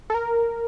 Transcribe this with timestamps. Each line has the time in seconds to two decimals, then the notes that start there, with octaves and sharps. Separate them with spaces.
0.10 A4
0.14 A#4